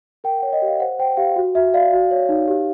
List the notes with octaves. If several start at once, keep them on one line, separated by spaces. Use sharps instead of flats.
A#4 G5
C#5 F#5
D#5
G4 F5
C5 F#5
C5 G5
G4 F5
F#4
F#4 E5
D5 F5
F#4
C#5
D#4
G4